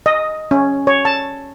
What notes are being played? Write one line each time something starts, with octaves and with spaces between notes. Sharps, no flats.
D#5
C#4
C#5
A5